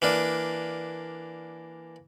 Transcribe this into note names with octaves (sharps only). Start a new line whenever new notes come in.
E3 A#3 D4